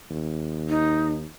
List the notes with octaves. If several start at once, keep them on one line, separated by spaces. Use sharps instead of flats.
D#2
D#4